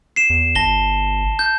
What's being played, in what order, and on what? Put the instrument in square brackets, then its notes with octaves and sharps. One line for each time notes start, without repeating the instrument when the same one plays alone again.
[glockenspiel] C7 E7
[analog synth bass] E2
[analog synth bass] G1 [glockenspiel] A5 A#6 G7
[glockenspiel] G6